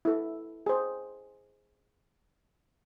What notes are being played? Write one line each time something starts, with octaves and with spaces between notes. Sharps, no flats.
E4 A4
G#4 C5